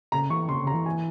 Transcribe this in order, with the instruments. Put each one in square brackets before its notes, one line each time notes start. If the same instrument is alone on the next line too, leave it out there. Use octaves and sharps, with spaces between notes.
[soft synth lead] C#3 [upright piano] A#5
[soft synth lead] E3 [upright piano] C#6
[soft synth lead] C#3 [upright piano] C6
[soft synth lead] C#3
[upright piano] A#5
[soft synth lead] E3
[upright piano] G#5